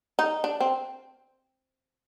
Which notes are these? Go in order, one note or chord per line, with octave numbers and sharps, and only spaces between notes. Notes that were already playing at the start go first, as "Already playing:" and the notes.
D#4
D4
C4